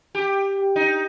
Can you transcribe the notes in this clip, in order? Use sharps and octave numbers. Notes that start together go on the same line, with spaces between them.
G4
D#4